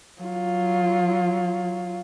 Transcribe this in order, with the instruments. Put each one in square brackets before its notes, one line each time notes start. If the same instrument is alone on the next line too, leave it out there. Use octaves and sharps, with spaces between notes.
[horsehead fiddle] F#3 F4